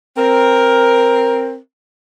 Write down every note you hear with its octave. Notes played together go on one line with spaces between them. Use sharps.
C4 A#4